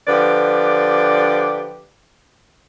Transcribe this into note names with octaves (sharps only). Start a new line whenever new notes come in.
D3 F3 G4 B4 D5